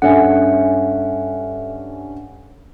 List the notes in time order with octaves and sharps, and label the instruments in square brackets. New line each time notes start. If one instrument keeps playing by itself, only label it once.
[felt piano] G2 C#4 [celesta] A4 E5 G#5 [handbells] F#5